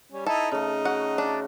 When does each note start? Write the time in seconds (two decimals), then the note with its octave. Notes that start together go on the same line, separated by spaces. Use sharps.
0.12 G3 C#4
0.26 D#4 E4 A4
0.51 C#3 A3 D#4
0.85 F#4 F#5
1.18 D4